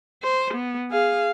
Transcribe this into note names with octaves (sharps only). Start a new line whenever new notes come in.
C5
B3
G#4 F5